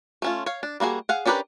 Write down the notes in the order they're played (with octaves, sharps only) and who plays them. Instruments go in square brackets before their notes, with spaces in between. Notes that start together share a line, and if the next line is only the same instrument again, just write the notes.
[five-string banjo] A3 C#4 F4
C#5 F5
D4
G3 A#3 F#4 G#4
G#4 F5 F#5
C#4 D4 G4 A#4 B4